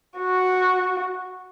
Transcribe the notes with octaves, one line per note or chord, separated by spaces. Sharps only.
F#4